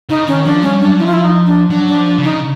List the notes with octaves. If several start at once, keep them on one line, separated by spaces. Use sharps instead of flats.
C#3 D#4
D#3 C#4
F3 D4
G3 C#4
F#3 D4
F3 E4
F4
E4
D#4
D4
F#3 D4
D4
F3
D4
C#3
D#4